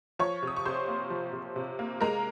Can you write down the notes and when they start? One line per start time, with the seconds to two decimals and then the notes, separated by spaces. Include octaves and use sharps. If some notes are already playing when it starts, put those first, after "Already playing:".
0.19 F3 C#5 C#6
0.43 C3 D#6
0.56 C#6
0.65 C3 C5 C6
0.88 A#3
1.10 F3
1.33 C3
1.56 C3
1.79 A#3
2.01 G#3 A#4 A#5